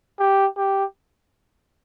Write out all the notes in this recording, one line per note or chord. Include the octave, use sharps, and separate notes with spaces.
G4
G4